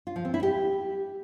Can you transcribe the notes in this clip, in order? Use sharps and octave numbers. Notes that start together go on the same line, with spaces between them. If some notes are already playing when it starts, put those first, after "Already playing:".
F4
F3
C4
E4
G4